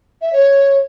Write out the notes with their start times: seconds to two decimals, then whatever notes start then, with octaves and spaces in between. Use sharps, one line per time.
0.22 E5
0.33 C#5